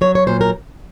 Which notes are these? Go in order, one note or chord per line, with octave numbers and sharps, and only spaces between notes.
F#3 C#5
C#5
A#2 C5
A#4